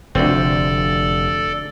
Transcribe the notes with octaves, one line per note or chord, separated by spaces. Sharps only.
F1 D2 C4 A4 D5